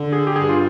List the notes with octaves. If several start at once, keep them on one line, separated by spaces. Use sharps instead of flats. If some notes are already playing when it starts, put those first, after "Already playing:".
Already playing: D3
G#4
G4
G2 G#4
F4